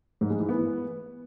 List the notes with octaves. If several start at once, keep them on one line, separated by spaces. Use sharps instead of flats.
G#2
G#3
E3
B3